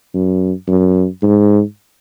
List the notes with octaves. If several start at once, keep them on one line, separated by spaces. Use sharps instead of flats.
F#2
F#2
G#2